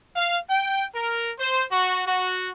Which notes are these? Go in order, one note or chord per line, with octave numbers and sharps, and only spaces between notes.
F5
G5
A#4
C5
F#4
F#4